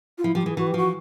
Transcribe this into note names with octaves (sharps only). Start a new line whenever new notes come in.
F4
F3 E4
F3 G4
E3 G#4
E3 F#4
G4
F3 F#4